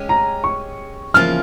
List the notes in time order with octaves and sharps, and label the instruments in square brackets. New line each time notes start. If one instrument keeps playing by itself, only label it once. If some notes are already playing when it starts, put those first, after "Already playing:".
Already playing: [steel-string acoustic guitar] G#3 C#4 G4
[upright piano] A#5
C#6
[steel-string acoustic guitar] E2 C#3 F3 A#3 F4 [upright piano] F6